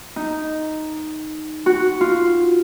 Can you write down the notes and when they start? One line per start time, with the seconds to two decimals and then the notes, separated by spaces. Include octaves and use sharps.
0.16 D#4
1.66 F#4
2.01 F4